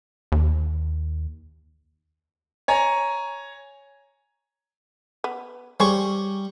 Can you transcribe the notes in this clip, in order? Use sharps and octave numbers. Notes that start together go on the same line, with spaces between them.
D#2
C#5 G#5 A#5
B3
G3 G#4 C5 C#5 C#6